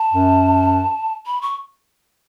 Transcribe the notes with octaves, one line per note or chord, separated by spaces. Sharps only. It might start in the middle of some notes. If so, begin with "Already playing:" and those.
Already playing: A5
F#2
B5
C#6